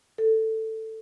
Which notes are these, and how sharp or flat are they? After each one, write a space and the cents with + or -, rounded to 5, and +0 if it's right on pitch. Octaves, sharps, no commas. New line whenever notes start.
A4 +10